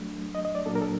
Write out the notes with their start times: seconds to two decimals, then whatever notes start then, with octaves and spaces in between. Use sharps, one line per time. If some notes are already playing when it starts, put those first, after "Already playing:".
Already playing: F#3 A3 D4
0.35 D#5
0.45 D#5
0.55 D5
0.66 A#2 F#3 A#3 D4 A4
0.75 A#4
0.82 A4